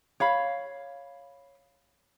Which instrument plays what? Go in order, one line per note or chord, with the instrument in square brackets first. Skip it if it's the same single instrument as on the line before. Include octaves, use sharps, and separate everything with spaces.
[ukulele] C#5 F5 B5